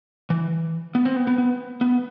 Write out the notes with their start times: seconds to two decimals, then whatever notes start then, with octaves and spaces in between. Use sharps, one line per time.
0.30 E3
0.95 B3
1.05 C4
1.16 B3
1.27 B3
1.38 B3
1.81 B3